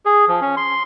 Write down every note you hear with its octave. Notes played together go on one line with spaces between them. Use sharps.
G#4
F3
C#4
C6